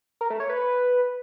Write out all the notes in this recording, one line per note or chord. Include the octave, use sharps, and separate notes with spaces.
A#4
A3
C#5
B4